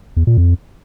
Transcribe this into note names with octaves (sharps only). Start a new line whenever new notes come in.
E2
A#2
F2